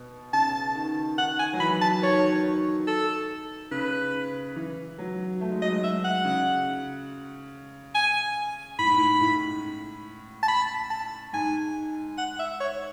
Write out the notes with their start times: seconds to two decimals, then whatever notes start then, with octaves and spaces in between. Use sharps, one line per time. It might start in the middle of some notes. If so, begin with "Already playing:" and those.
Already playing: B2
0.33 C#3 A5
0.75 D#3
1.18 D#3 F#5
1.39 G#5
1.53 F#3
1.60 E3 B5
1.81 A5
2.02 D#3 C#5
2.87 A4
3.71 C#3 B4
4.56 E3
4.99 F#3
5.41 A3
5.51 G#3
5.62 F#3 D#5
5.72 G#3
5.83 E5
6.04 F#5
6.25 C#3
7.95 G#5
8.79 A2 B5
8.87 G#2
8.94 A2
9.21 A2
10.43 A5
10.48 B5
10.90 A5
11.33 G#2 G#5
12.18 F#5
12.39 E5
12.60 C#5